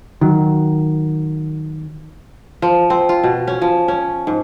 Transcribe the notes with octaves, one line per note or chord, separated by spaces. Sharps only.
D#3 F#3
F3
C4
F4
B2
C#4
F3
C#4
G#2